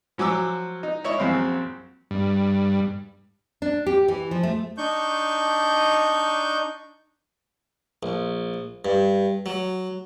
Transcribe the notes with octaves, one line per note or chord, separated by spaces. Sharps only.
F3 F#3 G#5 D6 E6
D#4
E4 C#5 D#5 C#6
A#1 F#2 C4 F5
G2
D4
G4
E3
F3
A3
D4 D#4 C#6 G6
A#1
G2
F#3